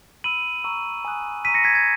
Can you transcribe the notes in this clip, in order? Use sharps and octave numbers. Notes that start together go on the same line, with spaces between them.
B5 E6 D#7 F#7
A#5 C#6 E6
G#5 D#6 F#6
A#5 C#6 E6 B6 D#7
A#6 C#7
G#6 B6
G#6